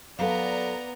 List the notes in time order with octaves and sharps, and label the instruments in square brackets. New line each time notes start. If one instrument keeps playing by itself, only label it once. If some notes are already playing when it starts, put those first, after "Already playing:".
[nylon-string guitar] F#3 A4 [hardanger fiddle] B3 [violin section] D5 A#5 [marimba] F5